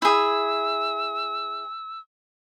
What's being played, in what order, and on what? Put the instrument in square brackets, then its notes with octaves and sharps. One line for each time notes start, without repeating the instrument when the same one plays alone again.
[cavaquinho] E4 G#4 [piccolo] E6